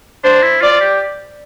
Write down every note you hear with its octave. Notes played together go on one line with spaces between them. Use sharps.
D4 C5
E4
F4 D5
G4